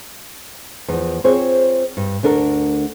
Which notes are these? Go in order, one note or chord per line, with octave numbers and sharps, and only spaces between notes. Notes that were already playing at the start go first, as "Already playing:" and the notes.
E2 F3
C4 F4 G#4 C5 C#5
G2
D2 D4 A4 A#4